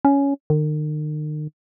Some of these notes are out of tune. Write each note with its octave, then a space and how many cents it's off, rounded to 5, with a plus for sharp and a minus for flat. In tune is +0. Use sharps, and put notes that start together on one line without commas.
C#4 +10
D#3 -40